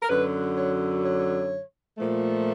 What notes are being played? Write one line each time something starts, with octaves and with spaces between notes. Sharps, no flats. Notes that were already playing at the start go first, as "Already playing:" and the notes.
A#4
F#2 D3 F#3 B4
C#5
C#5
A#2 F3 A3